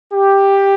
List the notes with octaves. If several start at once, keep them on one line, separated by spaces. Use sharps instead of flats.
G4